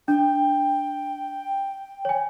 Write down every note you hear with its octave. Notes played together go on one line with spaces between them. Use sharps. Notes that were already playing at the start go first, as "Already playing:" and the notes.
D4 G5
C#5 G#5